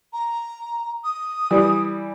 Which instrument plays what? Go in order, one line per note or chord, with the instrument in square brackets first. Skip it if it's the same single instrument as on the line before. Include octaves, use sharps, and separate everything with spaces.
[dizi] A#5
D#6
[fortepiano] E3 G3